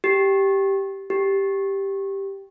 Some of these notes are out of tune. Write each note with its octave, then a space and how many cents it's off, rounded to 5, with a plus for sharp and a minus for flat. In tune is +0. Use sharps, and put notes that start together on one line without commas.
G4 -5
G4 +0